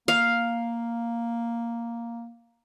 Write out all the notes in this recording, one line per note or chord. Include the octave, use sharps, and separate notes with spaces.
A#3 F5